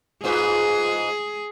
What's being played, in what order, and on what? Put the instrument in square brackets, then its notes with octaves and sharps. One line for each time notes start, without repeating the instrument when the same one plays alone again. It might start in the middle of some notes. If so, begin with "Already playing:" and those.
[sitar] G#2 F4 B4 [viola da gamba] G#4